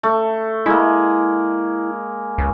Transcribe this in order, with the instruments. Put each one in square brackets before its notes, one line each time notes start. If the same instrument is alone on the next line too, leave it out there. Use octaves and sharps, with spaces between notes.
[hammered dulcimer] A3
[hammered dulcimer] G#3 A#3 [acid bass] E4
[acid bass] C#2